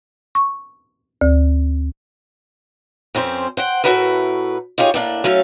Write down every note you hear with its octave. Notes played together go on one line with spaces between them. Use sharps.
C#6
D2
F2 C4 C#4 C5
C5 F#5 G5
A2 A3 D#4 F#4 A#4 B4
D#4 F4 G4 G#4 C#5
A2 A#3 D4
F#3 A3 C#4 F5